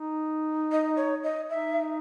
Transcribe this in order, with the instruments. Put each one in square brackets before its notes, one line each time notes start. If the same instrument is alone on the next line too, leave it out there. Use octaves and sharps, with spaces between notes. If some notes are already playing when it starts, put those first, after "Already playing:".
Already playing: [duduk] D#4
[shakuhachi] D#5
C#5
D#5
[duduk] D#4 [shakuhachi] E5